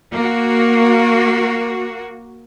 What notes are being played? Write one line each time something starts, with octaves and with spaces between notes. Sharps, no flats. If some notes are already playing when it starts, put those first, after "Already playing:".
A#3 F#4